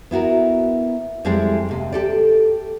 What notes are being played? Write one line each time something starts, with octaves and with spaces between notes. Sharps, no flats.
B3 E4 F#4 A#4
F2 G3 G#3 C4 E4 D5
D#2 C3
G4 A4 D5